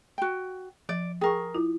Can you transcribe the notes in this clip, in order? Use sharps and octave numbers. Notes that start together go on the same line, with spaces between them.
F#4 G5
F3 D5
G#4 A#4 G5 C#6
E4 F4